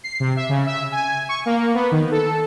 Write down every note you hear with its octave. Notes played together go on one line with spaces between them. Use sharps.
C7
C3
E5
C#3
E5
G#5
C#6
A#3
B3
D#3
A4